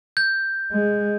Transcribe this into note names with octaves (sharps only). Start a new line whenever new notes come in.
G6
G#3